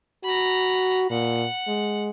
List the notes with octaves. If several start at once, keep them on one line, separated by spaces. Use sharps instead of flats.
F#4 A#5 B5
A#2 F#5
G#3